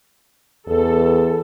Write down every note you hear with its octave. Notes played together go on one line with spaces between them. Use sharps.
E2 A4